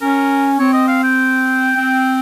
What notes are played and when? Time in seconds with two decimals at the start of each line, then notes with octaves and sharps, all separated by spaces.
0.01 C#4 A#4
0.59 C4 C#5
0.73 D#5
0.88 F5
1.03 G5
1.75 C4